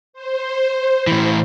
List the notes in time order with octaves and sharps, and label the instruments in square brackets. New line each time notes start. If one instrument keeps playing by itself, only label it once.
[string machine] C5
[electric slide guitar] A2 E3